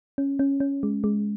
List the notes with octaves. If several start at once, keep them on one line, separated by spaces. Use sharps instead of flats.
C#4
C#4
C#4
G#3
G#3